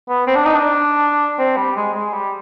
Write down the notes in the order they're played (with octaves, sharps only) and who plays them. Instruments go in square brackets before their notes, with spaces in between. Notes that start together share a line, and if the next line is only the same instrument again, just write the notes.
[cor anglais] B3
C4
D4
D#4
D4
C4
G3
G#3
G#3
G3